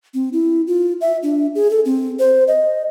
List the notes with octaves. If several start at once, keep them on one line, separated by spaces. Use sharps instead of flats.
C4
E4
F4
E5
D4
G#4
A4
C4
C5
D#5